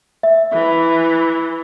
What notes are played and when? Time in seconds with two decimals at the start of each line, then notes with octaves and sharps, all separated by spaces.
0.23 E5
0.53 E3